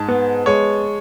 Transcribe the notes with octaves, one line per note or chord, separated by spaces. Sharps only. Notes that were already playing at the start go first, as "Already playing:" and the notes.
Already playing: G#2 A5
B3
G#3 C#5